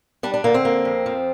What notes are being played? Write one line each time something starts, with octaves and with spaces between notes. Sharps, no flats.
G3 D4
D4
D3 A#3
C4
A#3
F2
F3